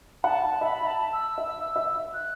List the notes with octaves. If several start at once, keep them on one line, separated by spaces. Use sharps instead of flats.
F#5 A5
E5 B5
B5
A5
E6
E5
E5
F#6